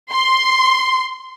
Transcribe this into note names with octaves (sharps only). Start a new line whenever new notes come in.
C6